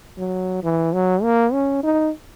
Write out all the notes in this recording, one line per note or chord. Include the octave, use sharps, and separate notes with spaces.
F#3
E3
F#3
A#3
C#4
D#4